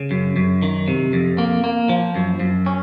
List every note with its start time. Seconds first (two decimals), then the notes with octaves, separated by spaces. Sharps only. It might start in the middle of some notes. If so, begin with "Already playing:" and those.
Already playing: C#3
0.11 F#2
0.36 F#2
0.62 D#3
0.88 C3
1.13 F2
1.38 A#3
1.64 A#3
1.89 F3
2.16 F#2
2.40 F#2
2.66 C#4